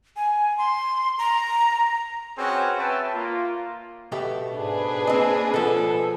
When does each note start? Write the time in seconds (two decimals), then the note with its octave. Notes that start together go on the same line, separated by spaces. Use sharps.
0.16 G#5
0.58 C6
1.18 A#5
2.38 C4 C#4 F#4 G#4 B4 C#5
2.78 B4 C#5 E5 G5 A5
3.15 A#3 F4
4.12 B2 A3 G4
4.54 G#2 D4 G#4 B4
5.07 A#3 C4 D#5
5.54 B2 F3 A4